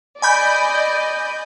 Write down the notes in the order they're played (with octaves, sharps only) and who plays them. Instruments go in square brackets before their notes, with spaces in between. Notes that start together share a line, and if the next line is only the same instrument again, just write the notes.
[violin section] D5 D#5 [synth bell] G#5 B5 G6